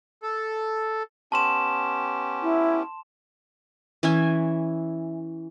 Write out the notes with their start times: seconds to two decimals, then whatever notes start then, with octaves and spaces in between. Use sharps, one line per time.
0.23 A4
1.32 B3 C#4 G4 A5 C6 E7
2.42 E4
4.03 E3 C#4 E5 G#5